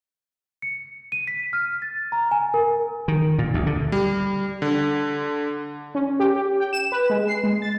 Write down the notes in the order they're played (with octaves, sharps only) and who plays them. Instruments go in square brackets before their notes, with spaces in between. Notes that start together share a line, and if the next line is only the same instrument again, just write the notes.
[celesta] C#7
D#7
B6
F6
A6
A#5
G#5
A#4
[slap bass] D#3
A#2
D2
D3
[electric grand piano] G3
D3
[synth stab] C#4
G4
G4
G5
E7
B4
G#3
C7
G#3
A6